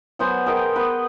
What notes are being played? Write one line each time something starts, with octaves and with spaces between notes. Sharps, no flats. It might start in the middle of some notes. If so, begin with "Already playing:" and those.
F#3 B3 C5 G#5
G#4 A#4 D#5 G5
B3 B4